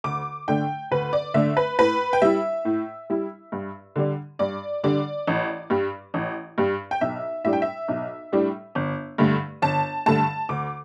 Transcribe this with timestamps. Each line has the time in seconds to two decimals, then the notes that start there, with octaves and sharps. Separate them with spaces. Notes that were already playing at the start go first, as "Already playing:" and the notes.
0.04 D2 D6
0.48 D3 A3 D4 G5
0.91 D2 B4
1.13 D5
1.34 D3 A3 D4 E5
1.57 B4
1.79 A2 B4
2.13 G5
2.22 G3 E4 E5
2.65 A2
3.10 G3 E4
3.52 G2
3.96 D3 G3 D4
4.39 G2 D5
4.83 D3 G3 D4 D5
5.27 A1
5.70 G2 G3
6.14 A1
6.58 G2 G3
6.91 G5
7.01 B1 E5
7.44 A2 G3 D4 E5
7.53 G5
7.62 E5
7.88 B1
8.32 A2 G3 D4
8.75 G1
9.18 G2 D3 A3
9.62 G1 A5
10.06 G2 D3 A3 A5
10.49 D2 D6